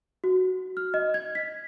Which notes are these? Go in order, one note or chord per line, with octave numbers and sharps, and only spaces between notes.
F#4
F6
D#5
G#6
B6